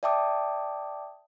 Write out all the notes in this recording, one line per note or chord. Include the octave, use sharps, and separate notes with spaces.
D5 E5 G5 A5 D6 D#6